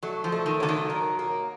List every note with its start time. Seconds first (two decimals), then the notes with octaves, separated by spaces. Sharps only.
0.03 F#3 A3
0.24 F3
0.32 A3
0.46 D#3
0.60 D3 F#3
0.69 D#3
0.90 A#3
1.19 A#3